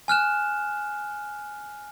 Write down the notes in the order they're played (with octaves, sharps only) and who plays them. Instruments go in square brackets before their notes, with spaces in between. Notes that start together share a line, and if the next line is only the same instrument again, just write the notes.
[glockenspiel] G#5 F6 F#6 E7